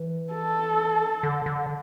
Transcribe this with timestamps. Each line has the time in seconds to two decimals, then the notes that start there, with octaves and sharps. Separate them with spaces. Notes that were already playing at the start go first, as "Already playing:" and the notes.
Already playing: E3
0.33 A4
1.23 D3
1.46 D3